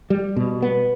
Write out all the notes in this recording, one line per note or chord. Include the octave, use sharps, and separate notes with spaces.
G3
B2
B3